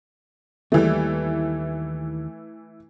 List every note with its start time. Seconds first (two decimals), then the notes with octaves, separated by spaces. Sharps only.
0.72 D#2 E3 G3 A3